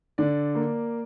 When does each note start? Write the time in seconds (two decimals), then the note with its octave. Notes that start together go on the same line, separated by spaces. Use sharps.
0.18 D3 D5
0.55 A#3